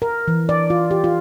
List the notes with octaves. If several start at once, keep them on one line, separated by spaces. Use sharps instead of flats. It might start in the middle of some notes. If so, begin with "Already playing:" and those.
A#4
E3
D5
F4
G4
F4